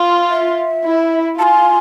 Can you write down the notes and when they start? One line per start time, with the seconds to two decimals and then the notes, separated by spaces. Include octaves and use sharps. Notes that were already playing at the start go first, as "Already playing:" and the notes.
Already playing: F4
0.30 E5
0.84 E4
1.39 F4 G#5 A5